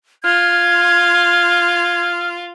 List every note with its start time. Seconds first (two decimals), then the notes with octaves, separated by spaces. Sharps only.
0.24 F4 F6 G#6